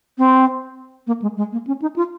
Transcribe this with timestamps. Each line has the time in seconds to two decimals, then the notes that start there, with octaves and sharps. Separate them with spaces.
0.18 C4
1.07 A#3
1.22 G#3
1.37 G#3
1.52 A#3
1.67 C#4
1.82 D#4
1.96 F4